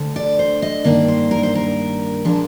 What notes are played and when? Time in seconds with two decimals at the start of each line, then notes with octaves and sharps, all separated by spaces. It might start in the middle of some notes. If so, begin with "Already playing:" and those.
Already playing: D2 D3
0.16 D5
0.39 C5
0.62 D#5
0.84 G2 D#3 A#3 D4 D5
1.08 C5
1.31 A#4
1.43 C5
1.55 A#4
2.24 A#2 F3 G#3 D4